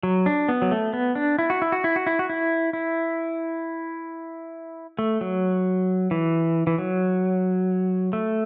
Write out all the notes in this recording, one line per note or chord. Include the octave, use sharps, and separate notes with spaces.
F#3
D4
B3
F#3
A3
B3
D4
E4
F#4
E4
F#4
E4
F#4
E4
F#4
E4
E4
A3
F#3
E3
E3
F#3
A3